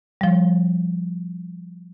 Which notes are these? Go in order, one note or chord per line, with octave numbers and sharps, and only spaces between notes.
F3 G3